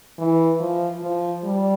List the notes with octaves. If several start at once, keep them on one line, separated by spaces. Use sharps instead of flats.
E3
F3
F3
G3